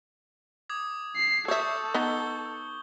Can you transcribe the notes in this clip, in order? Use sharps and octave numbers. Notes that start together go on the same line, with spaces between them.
D6 D#6 G#6
C7
A4 C#5 E5 C#6 D#6 G6
B3 D#4 G7